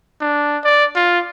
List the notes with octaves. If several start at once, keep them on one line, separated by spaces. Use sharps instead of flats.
D4
D5
F4